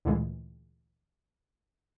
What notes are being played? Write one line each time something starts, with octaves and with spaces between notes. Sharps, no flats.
D2 A#2 E3 G#3